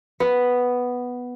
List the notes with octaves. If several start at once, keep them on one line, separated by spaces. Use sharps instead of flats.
B3